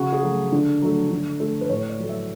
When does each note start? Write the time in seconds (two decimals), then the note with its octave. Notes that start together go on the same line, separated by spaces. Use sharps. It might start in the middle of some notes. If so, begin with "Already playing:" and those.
Already playing: C#3 F#4
0.12 G#4
0.23 F#3 A3
0.52 D3
0.82 F#3 A3
1.11 D3
1.40 A3
1.61 B4
1.69 A2 C#5
1.89 D5
1.99 F#3 A3
2.09 E5